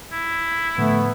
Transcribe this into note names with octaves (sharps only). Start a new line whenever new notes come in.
E4
A2 D3 F3 A3 B3